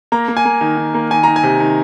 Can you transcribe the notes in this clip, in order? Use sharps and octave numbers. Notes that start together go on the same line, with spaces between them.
A#3 A#5
A#3
G#5
A#3
D#3
D#3
A#3
D#3 G#5
D#3 A#5
G#5
C3
D#3